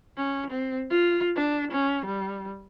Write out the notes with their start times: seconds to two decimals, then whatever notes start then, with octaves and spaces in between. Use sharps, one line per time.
0.17 C#4
0.50 C4
0.90 F4
1.35 D4
1.72 C#4
2.05 G3